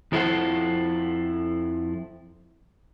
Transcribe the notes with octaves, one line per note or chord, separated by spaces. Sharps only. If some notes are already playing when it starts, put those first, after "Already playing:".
F2 F3 E4 A4 C5 F#5